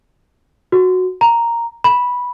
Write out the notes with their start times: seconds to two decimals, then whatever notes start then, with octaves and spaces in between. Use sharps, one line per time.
0.72 F#4
1.21 A#5
1.84 B5